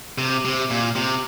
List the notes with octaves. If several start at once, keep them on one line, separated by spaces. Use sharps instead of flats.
C3
C3
A#2
C3